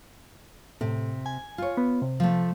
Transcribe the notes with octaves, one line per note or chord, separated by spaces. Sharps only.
A2 C3
G#5
F4 C#5
B3
C3
F3 A3